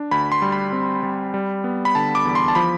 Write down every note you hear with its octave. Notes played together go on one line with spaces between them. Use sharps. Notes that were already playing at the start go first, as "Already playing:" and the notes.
Already playing: D4
D2 B5
C6
G3
B5
C4
G3
G3
B3
B5
D3 A5
D6
E2
C6
A5
F3 B5